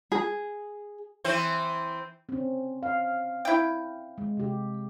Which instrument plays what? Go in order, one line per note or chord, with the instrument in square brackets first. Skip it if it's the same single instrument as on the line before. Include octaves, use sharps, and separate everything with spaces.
[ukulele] G#4
[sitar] E3 C4 C5
[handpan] C4 C#4
F5
[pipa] E4 G5
[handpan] G#3
C3 G4